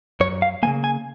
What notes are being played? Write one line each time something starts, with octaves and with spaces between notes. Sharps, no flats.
F#2 C#5
F5
C#3 F3 A#3 G#5
G#5